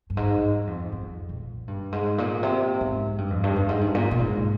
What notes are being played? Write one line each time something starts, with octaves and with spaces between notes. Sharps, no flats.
G2
G#2
G2
F2
F2
A#2
G2
G#2
A#2
C3
G#2
G2
F2
G2
G2
G#2
G2
A#2
A#2
G#2